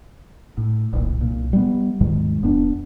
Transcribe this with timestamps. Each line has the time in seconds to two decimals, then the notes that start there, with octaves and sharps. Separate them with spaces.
0.57 A2
0.93 D#1 C2 A#2
1.18 C2 A#2
1.53 G3 B3
2.00 D#2 G#2 D#3 G#3
2.42 D#1 F2 B3 D4